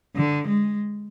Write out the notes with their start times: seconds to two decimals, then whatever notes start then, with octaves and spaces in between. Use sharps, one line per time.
0.16 D3
0.48 G#3